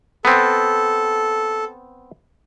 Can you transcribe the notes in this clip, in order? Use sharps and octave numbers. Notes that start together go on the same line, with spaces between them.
B3 C4 A4